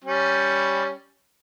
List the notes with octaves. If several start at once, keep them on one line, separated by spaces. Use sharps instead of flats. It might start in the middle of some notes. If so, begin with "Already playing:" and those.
G3 C#4